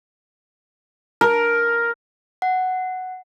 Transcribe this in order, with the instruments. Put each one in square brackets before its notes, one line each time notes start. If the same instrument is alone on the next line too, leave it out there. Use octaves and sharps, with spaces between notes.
[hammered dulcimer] A#4
[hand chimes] F#5